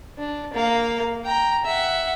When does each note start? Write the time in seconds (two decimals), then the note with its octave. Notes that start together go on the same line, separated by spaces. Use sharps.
0.18 D4
0.53 A#3 F5
1.24 G5 A#5
1.65 E5 F#5